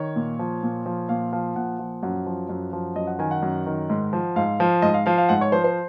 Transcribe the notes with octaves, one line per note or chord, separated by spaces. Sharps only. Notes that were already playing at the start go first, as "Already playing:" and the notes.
Already playing: D#3 C#5
A#2
F3
A#2
F3
A#2 F5
F3 F5
A#2 F#5
F3
F#2 F#5
F3
F#2
F3
F#2 D#5
F#5
D#3 G#5
F#5
F#2
D#3
G#2
F3
G#2 F5
F3
G#2 D#5
F5
F3 F5
F5
G#2 F#5
C#5
F3 C5
C5